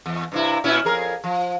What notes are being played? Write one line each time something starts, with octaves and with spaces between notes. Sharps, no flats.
E2
G2 C3 E4
A#2 C#4 E4
F2 G#4 A#4
F3